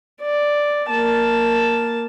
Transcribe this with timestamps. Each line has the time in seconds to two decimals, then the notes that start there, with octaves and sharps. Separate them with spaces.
0.21 D5
0.89 A#3 A5